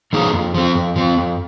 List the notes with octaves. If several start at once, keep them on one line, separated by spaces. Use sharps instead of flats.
F3 A#3 D#4 G#4
F2
F3 C4
F2
F3 C4
F2